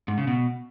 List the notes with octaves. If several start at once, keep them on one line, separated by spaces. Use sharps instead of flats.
G#2
C#3
B2